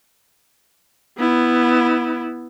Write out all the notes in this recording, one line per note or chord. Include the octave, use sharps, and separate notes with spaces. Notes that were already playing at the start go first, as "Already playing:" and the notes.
B3 E4